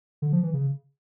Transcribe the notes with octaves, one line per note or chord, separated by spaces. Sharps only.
D3
F3
E3
C#3